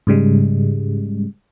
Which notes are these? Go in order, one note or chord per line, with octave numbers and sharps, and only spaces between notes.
G#2 C#3 G3 G#3